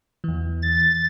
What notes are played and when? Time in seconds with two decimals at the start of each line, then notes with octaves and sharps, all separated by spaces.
0.24 E2 E3
0.62 A6